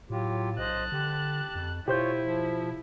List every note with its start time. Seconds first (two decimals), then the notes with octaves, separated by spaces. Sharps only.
0.10 A2 F#3 F4 G4
0.59 B1 C5 D#5 A5 F#6
0.92 D3 G4
1.56 F2
1.88 B2 E4 F4 G4 C5 C#5 G6
2.23 F3